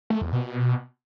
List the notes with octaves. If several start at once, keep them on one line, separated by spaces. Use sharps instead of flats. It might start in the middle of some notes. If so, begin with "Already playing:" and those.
A3
E2
B2